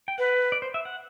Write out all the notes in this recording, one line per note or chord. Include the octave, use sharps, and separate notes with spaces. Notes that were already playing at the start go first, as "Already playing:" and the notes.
G5
B4 F#5
D5
C5
E5
F#5